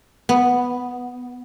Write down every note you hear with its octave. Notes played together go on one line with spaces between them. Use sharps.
B3